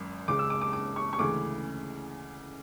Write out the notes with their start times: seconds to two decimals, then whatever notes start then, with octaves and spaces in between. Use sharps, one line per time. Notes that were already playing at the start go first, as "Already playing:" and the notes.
Already playing: G#1 F#2
0.28 C#2 C#3 G#3 D6
0.39 E6
0.50 D6
0.61 D6
0.73 D6
0.96 C#6
1.13 C#6
1.18 D2 C#3 E3 G#3 D6